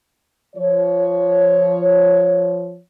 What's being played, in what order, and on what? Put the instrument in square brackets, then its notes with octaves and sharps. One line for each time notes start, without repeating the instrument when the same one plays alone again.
[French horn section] F3 C#5